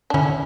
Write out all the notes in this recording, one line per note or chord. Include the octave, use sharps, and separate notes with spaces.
D4
D3 C#4 E4